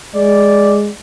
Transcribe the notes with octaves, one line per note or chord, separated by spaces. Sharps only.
G#3 D5